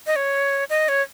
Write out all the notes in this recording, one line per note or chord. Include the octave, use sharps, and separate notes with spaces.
D#5
C#5
D#5
C#5